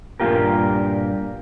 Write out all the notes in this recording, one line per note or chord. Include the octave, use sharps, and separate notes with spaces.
G2 A#2 A#3 F4 G4 A#4